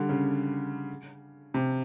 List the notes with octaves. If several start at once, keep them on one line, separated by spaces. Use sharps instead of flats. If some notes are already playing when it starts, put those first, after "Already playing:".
Already playing: D3 G3
C#3
C3